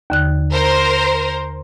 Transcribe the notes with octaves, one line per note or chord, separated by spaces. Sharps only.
D#2 D3 F#6
A#4 C5